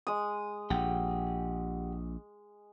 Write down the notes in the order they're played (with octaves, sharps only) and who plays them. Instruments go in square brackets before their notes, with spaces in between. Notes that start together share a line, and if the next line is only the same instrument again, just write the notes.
[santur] G#3 D#6
[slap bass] A#1 [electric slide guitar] G4 F#5 G5